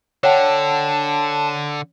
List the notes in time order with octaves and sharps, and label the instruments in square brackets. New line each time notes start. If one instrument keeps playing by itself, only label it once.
[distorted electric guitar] D3 [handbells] C#5 F#5 G5 [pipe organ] A5